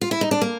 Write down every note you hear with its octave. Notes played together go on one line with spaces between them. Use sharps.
F4
E4
D#4
D4
A#3